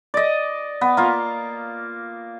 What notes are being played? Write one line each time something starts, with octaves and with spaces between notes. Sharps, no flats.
D5 D#5
B3
A#3 F4